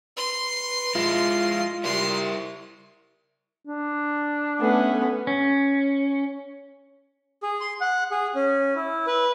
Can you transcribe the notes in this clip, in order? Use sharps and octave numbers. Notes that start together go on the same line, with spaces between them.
B4 C6
G#3 E4 F4
G3 E4 A#4 E5 C6
D4
A3 B3 C#4
C#4
G#4
C6
F#5
G#4
C#4
E4
B4